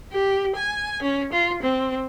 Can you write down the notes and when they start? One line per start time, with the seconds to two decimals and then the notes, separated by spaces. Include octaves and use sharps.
0.12 G4
0.56 G#5
1.02 C#4
1.32 F4
1.62 C4